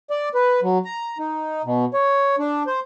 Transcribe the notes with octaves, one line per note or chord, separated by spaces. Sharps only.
D5
B4
F#3
A#5
D#4
B2
C#5
D4
C5